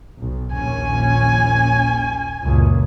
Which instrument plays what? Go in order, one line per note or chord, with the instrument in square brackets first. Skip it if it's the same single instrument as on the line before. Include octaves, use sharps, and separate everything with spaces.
[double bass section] B1
[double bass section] A#1 D#2 C#4 [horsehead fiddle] G#5
[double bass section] C#2 F#2 A#2